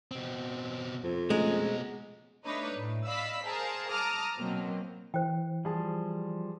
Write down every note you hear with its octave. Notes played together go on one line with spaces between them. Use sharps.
B2 C4
F2
B2 G#3 A3 C#4 A#5
A3 D4 D#4 B4 C#5
A2
D5 D#5 F5 B5 E6 B6
G#4 A#4 C5 F5 A5
A5 A#5 D6 D#6 F6
B2 F#3 A#3 C4
E3 C5 G5
F3 G3 G#4 A5